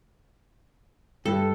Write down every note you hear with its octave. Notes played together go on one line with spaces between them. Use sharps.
G2 A4